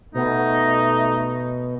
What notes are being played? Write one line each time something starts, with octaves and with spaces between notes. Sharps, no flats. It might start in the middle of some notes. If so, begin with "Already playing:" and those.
B2 A3 D#4